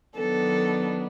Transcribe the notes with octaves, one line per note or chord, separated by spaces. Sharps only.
D#3 F#3 B3 D4 A4